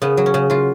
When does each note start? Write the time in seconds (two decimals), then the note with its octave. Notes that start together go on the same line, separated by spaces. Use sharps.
0.02 C#3 B3
0.17 F#3
0.26 C#4
0.34 C#3
0.50 F#3 F4